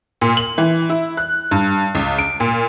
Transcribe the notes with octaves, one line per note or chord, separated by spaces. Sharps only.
A#2
F#7
E3
E4
F#6
G2
C#2
D7
A#2